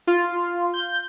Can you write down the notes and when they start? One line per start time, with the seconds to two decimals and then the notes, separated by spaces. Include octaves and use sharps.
0.07 F4
0.74 G6